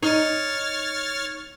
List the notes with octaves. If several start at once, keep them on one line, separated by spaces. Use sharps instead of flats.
D#4 C#5 F6 A6